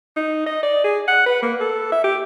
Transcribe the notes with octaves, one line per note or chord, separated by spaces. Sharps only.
D#4
D#5
D5
G#4
F#5
B4
A#3
A4
E5
G4